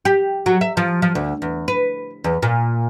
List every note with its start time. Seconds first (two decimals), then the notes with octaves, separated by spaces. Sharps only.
0.05 G4
0.46 F#3
0.61 E5
0.77 F3
1.02 F3
1.15 D2
1.42 E2
1.68 B4
2.24 E2
2.42 A#2